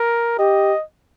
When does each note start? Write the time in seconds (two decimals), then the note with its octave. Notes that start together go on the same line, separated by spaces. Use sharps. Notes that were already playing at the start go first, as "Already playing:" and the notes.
Already playing: A#4
0.39 G4 D#5